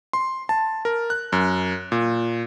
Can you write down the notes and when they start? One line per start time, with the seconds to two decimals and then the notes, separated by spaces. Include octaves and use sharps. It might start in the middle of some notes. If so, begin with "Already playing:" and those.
0.13 C6
0.49 A5
0.85 A#4
1.10 F#6
1.32 F#2
1.92 A#2